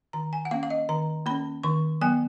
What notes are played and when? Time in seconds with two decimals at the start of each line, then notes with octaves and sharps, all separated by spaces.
0.13 D#3 A#5
0.33 G#5
0.45 F#5
0.51 A#3 C#4 F5
0.63 F5
0.70 D#5
0.89 D#3 A#5
1.26 A#3 C#4 B5
1.63 D#3 C#6
2.01 F#3 B3 G#5